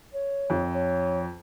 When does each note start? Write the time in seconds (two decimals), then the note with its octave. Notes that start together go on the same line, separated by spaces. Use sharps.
0.14 C#5
0.50 F2 F3
0.75 C#5